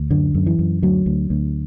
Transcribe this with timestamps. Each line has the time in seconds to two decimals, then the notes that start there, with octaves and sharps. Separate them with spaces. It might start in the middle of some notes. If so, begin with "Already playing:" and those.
Already playing: D2
0.10 F#2 D3
0.34 F#2
0.46 E3
0.59 F#2
0.82 D2 F#3
1.06 D2
1.30 D2